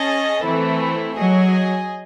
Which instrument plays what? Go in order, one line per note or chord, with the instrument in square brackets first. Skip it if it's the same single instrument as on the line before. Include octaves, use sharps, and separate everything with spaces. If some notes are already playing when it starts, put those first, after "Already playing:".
Already playing: [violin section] C#4 G#4 D#5 A5
[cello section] E3 [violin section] A3 C4 E4
[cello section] F#3 [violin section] G#4 D#5 G#5